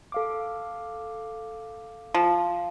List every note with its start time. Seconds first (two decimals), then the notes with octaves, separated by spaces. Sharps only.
0.12 A4 F5 D6
2.14 F3